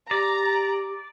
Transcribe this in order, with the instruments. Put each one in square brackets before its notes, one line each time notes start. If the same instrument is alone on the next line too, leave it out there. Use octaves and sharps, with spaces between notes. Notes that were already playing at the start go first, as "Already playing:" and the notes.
[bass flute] G4 [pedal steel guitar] D5 [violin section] A#5